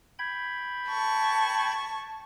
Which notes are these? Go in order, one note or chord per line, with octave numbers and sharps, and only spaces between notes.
G5 B5 G#6
A5 C#6